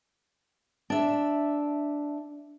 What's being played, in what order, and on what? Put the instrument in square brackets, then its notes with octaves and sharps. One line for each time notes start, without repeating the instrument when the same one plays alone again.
[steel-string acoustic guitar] D4 E5